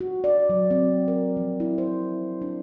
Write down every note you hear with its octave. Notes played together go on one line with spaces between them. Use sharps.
F#4
D5
F#3
C4
A#4
F3
E4
C5
D4